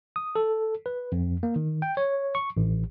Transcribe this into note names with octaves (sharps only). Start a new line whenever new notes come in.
D#6
A4
B4
F2
A#3
D#3
G5
C#5
C#6
A1